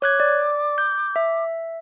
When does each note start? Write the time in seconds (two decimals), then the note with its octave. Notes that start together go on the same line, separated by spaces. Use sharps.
0.02 C#5 D6 F#6 G#6
0.20 D5
0.78 G6
1.16 E5